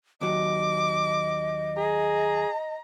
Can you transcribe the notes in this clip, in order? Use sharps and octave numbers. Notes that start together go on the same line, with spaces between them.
D#2 F#3 D#5 D6
G#4 A#5